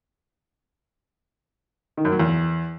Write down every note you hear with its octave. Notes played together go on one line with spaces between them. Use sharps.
D#3
F#2
F#3
E2